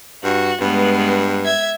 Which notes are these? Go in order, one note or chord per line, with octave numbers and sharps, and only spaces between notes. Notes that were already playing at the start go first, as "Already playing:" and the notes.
G2 F#4
G2 G#3 B3
E5 G#6